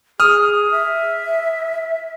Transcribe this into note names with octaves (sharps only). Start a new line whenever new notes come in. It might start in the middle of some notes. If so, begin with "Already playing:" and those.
G#4 D#6 F6
E5